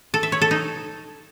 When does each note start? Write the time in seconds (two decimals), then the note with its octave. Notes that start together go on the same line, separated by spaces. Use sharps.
0.14 A4
0.23 E5
0.32 C#5
0.42 A4
0.51 D#4